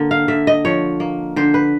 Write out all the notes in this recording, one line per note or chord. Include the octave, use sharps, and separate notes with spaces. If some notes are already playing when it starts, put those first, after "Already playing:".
Already playing: D3 A#3
F5
D3 E5
D#5
F3 C#5
A#3
D3 C5
B4